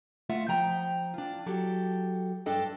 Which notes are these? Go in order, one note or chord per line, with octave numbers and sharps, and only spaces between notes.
A3 A#3 F4 E5 F#5
F3 G5 A#5
D4 F4
F#3 G4 A4
G2 D4 A4 D#5 G5